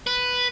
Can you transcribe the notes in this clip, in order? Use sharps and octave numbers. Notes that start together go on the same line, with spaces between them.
B4